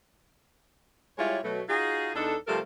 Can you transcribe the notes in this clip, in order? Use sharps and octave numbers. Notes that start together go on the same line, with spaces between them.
G3 G#3 E4 F4 C#5
B2 F#3 A3
D#4 F4 F#4 G#4
E2 D4 D#4 A4
C3 F3 G3 A3 A4 A#4